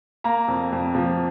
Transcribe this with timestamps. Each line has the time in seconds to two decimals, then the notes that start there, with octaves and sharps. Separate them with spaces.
0.24 A#3 A#5
0.48 F2
0.72 F2
0.95 F3